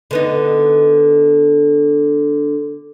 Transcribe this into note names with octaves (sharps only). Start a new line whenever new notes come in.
D3 B3 D#4